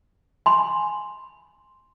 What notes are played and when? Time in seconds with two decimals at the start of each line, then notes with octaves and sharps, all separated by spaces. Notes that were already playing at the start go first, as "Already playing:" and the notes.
0.46 G#5 B5 C6